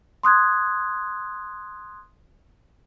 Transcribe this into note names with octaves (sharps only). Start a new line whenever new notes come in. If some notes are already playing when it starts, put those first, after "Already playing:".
C6 D#6 F#6 G#6